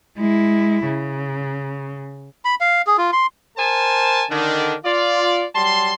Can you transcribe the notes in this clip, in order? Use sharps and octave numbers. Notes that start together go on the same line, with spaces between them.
G#3 E4
C#3
B5
F5
G#4
F4
C6
A#4 C5 G#5 A5
D3 D#3 D4
F4 D5
F#3 G3 A5 C6